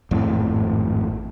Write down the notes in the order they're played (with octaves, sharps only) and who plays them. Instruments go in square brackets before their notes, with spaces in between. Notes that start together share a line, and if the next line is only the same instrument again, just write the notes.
[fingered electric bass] G#1 F2 A2